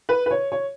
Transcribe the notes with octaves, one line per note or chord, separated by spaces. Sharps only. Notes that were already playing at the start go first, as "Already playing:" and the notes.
B4
B4
C#5
C#5